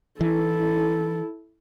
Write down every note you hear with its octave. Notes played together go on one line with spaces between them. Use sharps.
E3 E4 A4